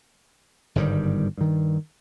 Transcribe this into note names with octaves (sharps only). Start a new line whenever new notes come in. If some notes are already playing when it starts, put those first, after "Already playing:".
G1 G#2 D#3 G3
G2 D#3